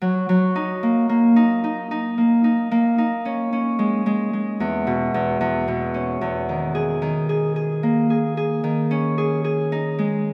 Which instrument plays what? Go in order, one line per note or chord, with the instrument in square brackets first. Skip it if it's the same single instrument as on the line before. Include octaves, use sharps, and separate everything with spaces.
[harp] F#3
F#3
D#4
A#3
A#3
D#4
D#4
D#4
A#3
D#4
A#3
D#4
C#4
C#4
G#3
G#3
G#3
E2
B2
E2
E2
B2
C#4
E2
D#3
G#4
D#3
G#4
G#4
A#3
G#4
G#4
D#3
C#4
G#4
G#4
D#4
G#3